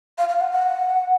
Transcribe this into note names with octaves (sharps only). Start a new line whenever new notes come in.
F5
F5
F#5
F#5